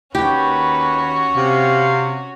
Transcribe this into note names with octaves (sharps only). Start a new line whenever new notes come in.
D#2 C#4 F#4 G4 B4
C3 F5